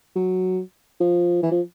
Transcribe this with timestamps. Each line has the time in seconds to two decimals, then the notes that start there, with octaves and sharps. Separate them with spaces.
0.16 F#3
1.00 F3
1.43 E3
1.51 F3